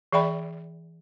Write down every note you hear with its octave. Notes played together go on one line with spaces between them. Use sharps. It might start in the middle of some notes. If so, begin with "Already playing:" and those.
E3 G#4 D5 E5 G5 B5